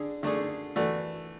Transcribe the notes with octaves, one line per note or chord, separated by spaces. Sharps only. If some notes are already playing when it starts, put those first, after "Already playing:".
Already playing: D3 D4 G#4
D3 A3 D4 G#4
E3 A3 D4 F#4